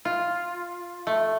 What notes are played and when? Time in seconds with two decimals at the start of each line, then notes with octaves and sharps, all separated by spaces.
0.05 F4
1.07 A3